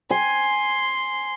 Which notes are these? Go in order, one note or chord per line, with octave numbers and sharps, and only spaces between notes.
G#5 C6